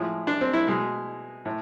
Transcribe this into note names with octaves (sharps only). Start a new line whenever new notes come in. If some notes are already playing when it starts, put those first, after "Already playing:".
Already playing: A2 F3 G#3
D4
C4
E4
B2 G#3
A2